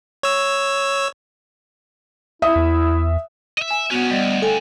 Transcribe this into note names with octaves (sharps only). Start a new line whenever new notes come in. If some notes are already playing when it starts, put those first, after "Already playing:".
C#5 E6
E4 E5 D#6
E2
D#5 E5
G#5
G2 B3 C#4 F#4
D2 G3 D5 D#5
A4 G5 G#5